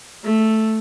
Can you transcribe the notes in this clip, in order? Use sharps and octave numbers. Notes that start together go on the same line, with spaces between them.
A3